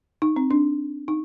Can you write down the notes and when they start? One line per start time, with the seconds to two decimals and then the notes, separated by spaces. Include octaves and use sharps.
0.22 D#4
0.36 C4
0.51 D4
1.08 D#4